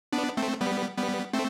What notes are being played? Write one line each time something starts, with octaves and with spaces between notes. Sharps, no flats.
B3 D4
A3 C4
G3 B3
G3 B3
A3 C4